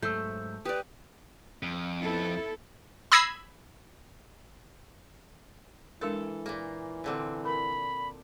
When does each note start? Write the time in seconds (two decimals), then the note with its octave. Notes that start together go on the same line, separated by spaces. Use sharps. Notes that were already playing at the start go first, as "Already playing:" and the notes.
0.02 G#2 F#3 A3 C5 E6 G6
0.65 G4 B4 D5 D#6
1.63 F2
2.01 B3 E4 A4
3.12 B5 D#6 E6 G#6 A#6 C7
6.01 E3 G#3 D4 A4 A#4
6.46 A#2 A#3
7.04 A#2 D3 C4
7.45 A#4 B5